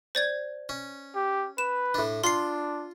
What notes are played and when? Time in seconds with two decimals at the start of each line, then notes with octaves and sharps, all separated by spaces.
0.15 C5 D5 G#6
0.69 C#4
1.15 G4
1.58 B4 E7
1.94 A2 D4
2.24 D4 F4 C6 C7